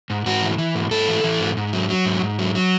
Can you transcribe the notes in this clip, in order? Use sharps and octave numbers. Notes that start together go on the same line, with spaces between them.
G#2
G#2 F#4
E3
E3
G#2
G#2 A4
E3
E3
G#2
G#2
F#3
F#3
G#2
G#2
F#3
F#3